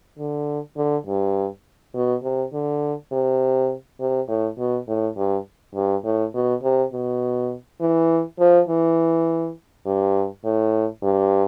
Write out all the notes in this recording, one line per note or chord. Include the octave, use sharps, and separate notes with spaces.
D3
D3
G2
B2
C3
D3
C3
C3
A2
B2
A2
G2
G2
A2
B2
C3
B2
E3
F3
E3
G2
A2
G2